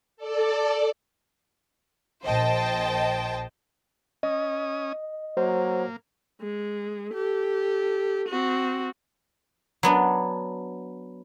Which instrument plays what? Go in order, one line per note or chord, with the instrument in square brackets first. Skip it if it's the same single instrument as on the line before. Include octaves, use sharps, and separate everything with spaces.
[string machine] A4 D5
[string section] A#1 C5 D#5 G5 A5
[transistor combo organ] C#4 D#6 [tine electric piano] D#5
[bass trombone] F#3 [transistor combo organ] A#3 [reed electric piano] C5
[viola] G#3
G4 A4
C4 F#4
[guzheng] F#3 B3 D4